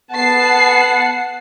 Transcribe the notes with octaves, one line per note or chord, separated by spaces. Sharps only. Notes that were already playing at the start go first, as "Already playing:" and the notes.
B3 F#5 A5 C7